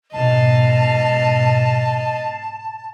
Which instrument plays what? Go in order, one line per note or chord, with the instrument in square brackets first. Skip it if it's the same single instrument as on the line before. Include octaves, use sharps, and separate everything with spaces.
[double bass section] G#2 B2 [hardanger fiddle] D#5 F5 [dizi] A5